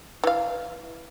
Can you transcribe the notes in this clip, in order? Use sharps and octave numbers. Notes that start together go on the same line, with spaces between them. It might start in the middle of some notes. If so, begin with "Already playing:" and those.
E3 F5